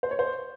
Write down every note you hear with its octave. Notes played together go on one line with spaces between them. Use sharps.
C5
C#5
C5